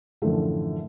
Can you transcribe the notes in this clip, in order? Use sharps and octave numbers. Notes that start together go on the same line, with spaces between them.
F#2 A2 D3 E3 F3